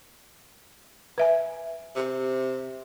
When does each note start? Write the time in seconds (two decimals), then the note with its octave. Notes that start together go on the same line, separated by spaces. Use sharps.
1.18 B4 E5 G#5
1.96 C3